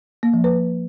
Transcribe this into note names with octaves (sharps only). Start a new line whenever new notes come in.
A#3
F3
B4